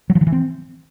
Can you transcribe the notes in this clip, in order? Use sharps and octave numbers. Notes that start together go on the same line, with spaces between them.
F#3
F3
D#3
E3
C4